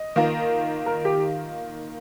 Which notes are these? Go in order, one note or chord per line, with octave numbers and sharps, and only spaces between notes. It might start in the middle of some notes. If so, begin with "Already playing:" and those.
Already playing: D#5
D#3 A#3 F4 A#4
A#4
G4